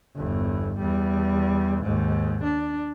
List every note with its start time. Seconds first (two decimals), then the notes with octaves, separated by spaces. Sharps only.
0.16 G1 E2
0.79 E2 G3
1.82 D#2 G#2
2.44 D4